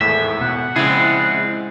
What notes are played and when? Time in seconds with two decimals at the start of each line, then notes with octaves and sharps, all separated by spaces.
0.01 G#1 E2 A2 A3 E5
0.41 B2 F#5
0.76 A#1 C#3 G#3 C4 E4 G#4 A6